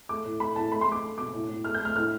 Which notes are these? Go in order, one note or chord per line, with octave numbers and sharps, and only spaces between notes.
A3 D6
A2
A3 B5
A2 A5
A3 B5
C6
A3 D6
A3
B2 D6
A2
A2
A3 F6
G6
A3
F6
A2 F6